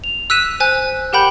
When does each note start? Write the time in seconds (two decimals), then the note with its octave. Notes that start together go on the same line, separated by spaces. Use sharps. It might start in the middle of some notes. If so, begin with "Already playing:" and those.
0.04 F7
0.30 E6 F#6 B6 D#7 E7
0.60 C5 G#5 F#6
1.13 G4 A#4 F#5 G5 B5 G6